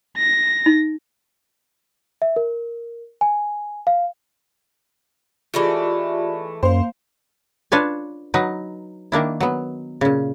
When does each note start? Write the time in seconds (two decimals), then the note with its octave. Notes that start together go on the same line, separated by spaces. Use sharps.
0.17 A#6
0.66 D#4
2.22 E5
2.36 A#4
3.21 G#5
3.87 F5
5.54 E3 G#3 A3 F4 G4 D5
6.63 F#2 A#3 C5 F5
7.72 D4 F4 B4 C#5 G#5
8.34 F#3 D#4 B4
9.12 D#3 A#3 D4 E4
9.40 F#3 B3
10.01 A#2 C#3